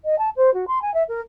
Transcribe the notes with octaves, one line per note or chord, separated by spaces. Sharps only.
D#5
A5
C5
F#4
C6
G#5
E5
A#4